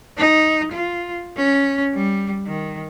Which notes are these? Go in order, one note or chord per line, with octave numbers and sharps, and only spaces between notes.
D#4
F4
C#4
G3
D#3